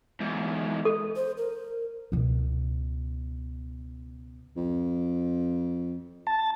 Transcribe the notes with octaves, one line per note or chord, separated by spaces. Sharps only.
E2 G#2
A4
C5
A#4
C#2 B2
F2
A5